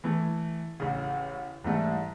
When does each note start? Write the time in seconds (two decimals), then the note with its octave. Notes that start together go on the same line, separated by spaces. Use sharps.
0.04 E3 A3
0.80 A1 C#3
1.64 G#2 E3 G3 A3